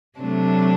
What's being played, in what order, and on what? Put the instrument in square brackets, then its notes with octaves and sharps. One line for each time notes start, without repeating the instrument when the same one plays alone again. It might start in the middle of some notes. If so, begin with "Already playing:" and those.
[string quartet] C3 F#3 A3 D4